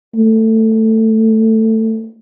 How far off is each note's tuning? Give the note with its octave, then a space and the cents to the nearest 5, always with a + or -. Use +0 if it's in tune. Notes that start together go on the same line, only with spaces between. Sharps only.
A3 +15